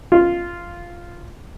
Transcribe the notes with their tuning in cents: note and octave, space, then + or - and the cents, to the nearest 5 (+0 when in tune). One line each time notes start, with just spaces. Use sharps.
F4 -5